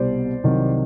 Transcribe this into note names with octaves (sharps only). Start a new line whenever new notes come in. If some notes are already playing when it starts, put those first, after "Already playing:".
Already playing: C2 B2 G3 C5 D5
C2 C3 D#3 F#3